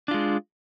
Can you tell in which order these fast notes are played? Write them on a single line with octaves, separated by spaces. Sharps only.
D4 F4 G#3